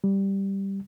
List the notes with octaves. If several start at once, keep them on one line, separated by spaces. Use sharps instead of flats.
G3